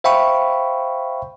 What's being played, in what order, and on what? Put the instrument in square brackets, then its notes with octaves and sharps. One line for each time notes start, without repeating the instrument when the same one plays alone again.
[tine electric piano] C5 E5 F5 G5 B5 C#6